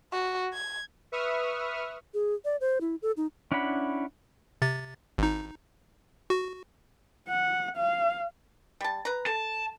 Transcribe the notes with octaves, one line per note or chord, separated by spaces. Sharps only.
F#4
G#6
B4 E5 C#6 D#6 F6
G#4
D5
C5
E4
A4
D#4
C#4 D4 E4 F#5 B5
C3 A6
G#1 D#4
F#4
F#5
F5
G3 A5
B4 A#5
A4 A5